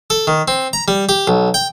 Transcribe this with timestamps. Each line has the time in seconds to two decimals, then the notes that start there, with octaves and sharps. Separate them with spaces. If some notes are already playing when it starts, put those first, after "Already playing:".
0.10 A4
0.27 D#3
0.48 C4
0.73 A#5
0.88 G3
1.09 G4
1.27 B1
1.54 G5